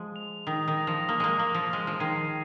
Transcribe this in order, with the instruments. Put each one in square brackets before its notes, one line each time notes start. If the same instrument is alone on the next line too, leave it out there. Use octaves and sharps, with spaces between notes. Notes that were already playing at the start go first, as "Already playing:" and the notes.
Already playing: [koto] F3 G#3
[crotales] F7
[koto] D#3 [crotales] D#6
[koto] D#3
[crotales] A#6 F7
[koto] F3
[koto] A#3 [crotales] D#6
[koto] G#3 A#3
[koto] A#3 [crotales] A#6 F7
[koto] F3
[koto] G#3 [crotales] F6
[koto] F3
[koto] D#3 [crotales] G#6 C7 D#7